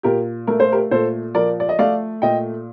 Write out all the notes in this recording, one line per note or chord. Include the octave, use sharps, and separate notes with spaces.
A#2 G4 A#4
A3 A#4
C5
G4 A#4
A#2 A4 C5
F3 A#4 D5
D5
D#5
A3 D5 F5
A#2 D#5 G5